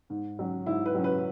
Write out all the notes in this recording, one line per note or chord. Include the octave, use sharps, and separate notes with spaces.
G#2
F#3 C#4
G#2 E4
B4
F#3 C#4
B4